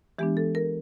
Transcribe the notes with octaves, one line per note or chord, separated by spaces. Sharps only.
E3 G#3 B3 D4 G4
A4
A#4